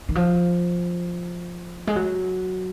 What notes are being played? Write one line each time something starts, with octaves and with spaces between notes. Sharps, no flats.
D#3
F3
G#3
F#3